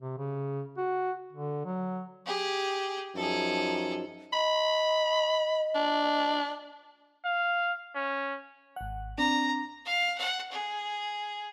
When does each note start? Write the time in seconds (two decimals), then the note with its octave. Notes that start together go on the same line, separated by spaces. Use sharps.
0.01 C3
0.18 C#3
0.78 F#4
1.33 D3
1.65 F#3
2.26 G4 G#4
3.16 F#2 F3 D#4 G#4 A4
4.33 D#5 B5
5.75 D4
7.25 F5
7.95 C#4
8.76 G#1 F#5
9.18 C4 D4 A#5
9.85 F5
10.18 F#5
10.52 G#4